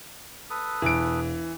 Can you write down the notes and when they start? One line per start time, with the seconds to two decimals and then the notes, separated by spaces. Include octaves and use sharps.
0.50 A4 B4 D#6
0.82 E1 E3 D7